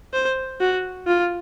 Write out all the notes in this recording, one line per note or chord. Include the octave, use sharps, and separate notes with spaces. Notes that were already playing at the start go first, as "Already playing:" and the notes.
C5
F#4
F4